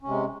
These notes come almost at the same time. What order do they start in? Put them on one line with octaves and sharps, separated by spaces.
C#4 C3 G#3